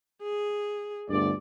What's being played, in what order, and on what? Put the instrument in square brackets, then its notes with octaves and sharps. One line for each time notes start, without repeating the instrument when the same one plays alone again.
[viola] G#4
[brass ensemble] G1 D2 D5